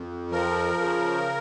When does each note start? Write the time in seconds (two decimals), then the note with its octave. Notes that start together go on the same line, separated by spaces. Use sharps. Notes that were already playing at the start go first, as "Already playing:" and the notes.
Already playing: F2
0.32 F3 A#4
0.80 C#3